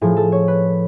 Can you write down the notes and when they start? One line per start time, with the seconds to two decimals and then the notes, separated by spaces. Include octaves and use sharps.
0.01 A2 F3 G#4
0.17 A4
0.32 C#5
0.48 B4